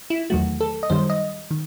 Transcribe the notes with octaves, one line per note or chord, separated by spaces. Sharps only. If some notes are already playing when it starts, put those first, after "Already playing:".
E4
E2 D#3 F#3 A3 F#4
A4
D#5
F#2 D#3 G3 C5
D#5
D#3